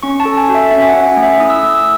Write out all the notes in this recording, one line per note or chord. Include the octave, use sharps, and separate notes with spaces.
C#4 C#6
A5
A4
G#5
F#4
E5
C#4 E5
G#5
F#5
C#4
G#5
A3
E5
E4 D#6
E6
A3 D#6
E6